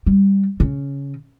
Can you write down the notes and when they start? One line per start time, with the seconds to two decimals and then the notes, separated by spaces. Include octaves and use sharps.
0.06 G3
0.60 C#3